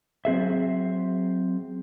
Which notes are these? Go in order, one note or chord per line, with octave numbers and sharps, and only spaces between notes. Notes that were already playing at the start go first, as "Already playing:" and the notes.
F#3 C4 G#4 E5